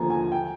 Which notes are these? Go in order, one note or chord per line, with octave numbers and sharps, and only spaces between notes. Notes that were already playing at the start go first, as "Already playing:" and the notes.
Already playing: D#2 D3 F3 G#5 A#5
G#5
G5